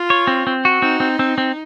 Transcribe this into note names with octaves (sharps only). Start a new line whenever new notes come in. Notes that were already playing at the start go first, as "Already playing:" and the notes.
Already playing: F4
C#5
C4
C4
F#4
C4 D#4
C4
C4
C4